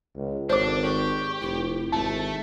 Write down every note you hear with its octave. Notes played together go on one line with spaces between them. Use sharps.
C#2
G#1 D4 A4 C5 C#5 D6
G4 C#6
F1 E4
G#1 A3 A5